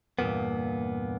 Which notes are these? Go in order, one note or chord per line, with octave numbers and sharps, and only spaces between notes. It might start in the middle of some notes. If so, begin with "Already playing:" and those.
E2 G2 A#2 A#3 B3